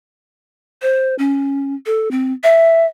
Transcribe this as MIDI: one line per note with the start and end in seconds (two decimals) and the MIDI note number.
0.82 1.15 72
1.19 1.75 61
1.86 2.11 69
2.11 2.33 60
2.44 2.86 76